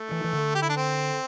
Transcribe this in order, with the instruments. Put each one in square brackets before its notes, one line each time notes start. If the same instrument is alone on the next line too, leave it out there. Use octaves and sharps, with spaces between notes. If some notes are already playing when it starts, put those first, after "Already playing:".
Already playing: [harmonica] A3
[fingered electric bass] E3
E3
D3
[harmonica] G4
E4
D4
C4